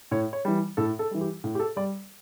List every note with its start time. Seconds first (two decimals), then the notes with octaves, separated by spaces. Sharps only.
0.11 A2 C#5
0.33 C#5
0.45 E3 G3
0.77 A2 A4
0.99 A4
1.11 E3 G3
1.21 G4
1.44 A2
1.55 G4
1.60 A4
1.76 G3 D5